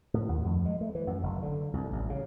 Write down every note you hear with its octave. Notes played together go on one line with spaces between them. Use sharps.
A2
D#2
F2
G#3
A3
E3
F#2
F#1
D3
C2
A1
C#3